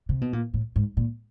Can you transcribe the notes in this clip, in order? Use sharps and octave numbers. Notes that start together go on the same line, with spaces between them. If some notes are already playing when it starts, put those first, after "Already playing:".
C3
B2
A#2
A2
G#2
A#2